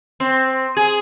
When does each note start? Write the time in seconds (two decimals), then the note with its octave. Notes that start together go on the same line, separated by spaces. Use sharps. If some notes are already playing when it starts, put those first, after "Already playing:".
0.20 C4
0.77 G#4